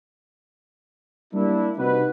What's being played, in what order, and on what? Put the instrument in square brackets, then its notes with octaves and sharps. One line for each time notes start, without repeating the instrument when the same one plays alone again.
[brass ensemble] G3 A#3 D4 E4
C3 D#4 F#4 B4